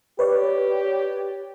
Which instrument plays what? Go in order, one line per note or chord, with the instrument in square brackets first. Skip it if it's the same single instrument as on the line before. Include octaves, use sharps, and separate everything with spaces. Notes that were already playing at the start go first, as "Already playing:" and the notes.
[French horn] G4 [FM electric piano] B4 C#5 D5